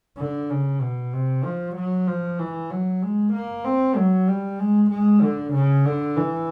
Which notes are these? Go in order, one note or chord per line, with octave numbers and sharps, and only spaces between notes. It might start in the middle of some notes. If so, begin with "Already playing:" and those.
D3
C#3
B2
C3
F3
F#3
F3
E3
F#3
G#3
A#3
C4
F#3
G3
G#3
G#3
D3
C#3
D3
E3